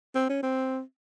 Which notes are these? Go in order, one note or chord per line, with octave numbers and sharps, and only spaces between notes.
C4
C#4
C4